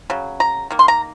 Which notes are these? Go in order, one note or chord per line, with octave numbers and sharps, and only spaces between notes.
C#3 F#3
A#5
D#3 A#3
C6
A#5